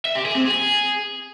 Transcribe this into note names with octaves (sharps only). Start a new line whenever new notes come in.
E5
G4
G#4
C4
G#4